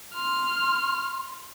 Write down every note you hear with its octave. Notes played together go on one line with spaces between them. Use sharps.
C6 F6